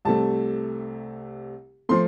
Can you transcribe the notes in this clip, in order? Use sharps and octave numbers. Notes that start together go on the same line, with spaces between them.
C2 C3 A3 A5
F3 A3 C6